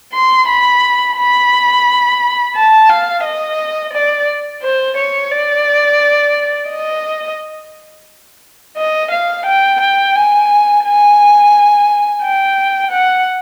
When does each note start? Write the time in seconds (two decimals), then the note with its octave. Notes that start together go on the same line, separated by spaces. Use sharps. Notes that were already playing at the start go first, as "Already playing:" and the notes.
0.13 C6
0.48 B5
1.17 B5
2.56 A5
2.89 F5
3.25 D#5
3.94 D5
4.62 C5
4.97 C#5
5.31 D5
6.70 D#5
8.77 D#5
9.12 F5
9.46 G5
9.81 G5
10.15 G#5
10.84 G#5
12.22 G5
12.92 F#5